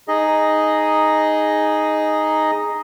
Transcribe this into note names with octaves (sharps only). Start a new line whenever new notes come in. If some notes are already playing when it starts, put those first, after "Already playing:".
D#4 G#4 D#5